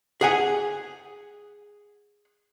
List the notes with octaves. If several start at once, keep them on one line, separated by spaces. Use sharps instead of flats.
G#4 F#5 G#5